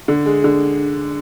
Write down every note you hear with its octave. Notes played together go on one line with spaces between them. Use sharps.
D3
G#3
D3